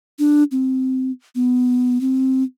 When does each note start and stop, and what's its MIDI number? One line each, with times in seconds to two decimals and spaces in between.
0.19 0.44 62
0.51 1.11 60
1.35 2.00 59
2.01 2.43 60